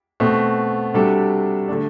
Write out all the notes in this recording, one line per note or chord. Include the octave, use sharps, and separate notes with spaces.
B2 A3 C4
C3 G3 D4 F#4 A4
D3 A3 D4